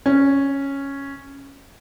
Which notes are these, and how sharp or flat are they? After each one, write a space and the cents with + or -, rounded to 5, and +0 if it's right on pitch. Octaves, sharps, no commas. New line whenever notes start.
C#4 -5